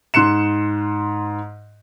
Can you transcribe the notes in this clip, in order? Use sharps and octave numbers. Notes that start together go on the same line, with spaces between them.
G#2 C6 F#6 C#7 E7